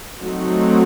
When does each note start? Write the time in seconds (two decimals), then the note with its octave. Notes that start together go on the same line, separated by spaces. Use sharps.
0.22 F#3 A3 C4 D#4 F#4